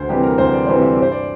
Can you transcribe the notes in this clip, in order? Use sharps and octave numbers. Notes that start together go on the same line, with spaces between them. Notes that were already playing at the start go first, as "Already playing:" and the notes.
Already playing: D2 C5
C3 E3 G3 G4
A#4
D2 C5
D5
C3 E3 G3 C5
E5
G2 D5
C5
D5